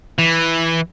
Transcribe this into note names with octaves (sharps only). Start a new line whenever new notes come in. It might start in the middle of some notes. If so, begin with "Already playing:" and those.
E3